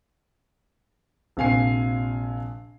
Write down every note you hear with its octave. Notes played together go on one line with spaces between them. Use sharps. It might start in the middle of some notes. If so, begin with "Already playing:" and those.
A#1 C3 F5 G#5 C7